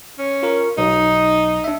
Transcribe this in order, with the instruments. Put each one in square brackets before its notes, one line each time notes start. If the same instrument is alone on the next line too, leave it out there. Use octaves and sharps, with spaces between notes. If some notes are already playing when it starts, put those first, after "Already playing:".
[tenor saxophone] C#4
[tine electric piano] F4 A#4 C#6
[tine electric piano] B1 [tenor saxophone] D#4
[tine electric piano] D4 E5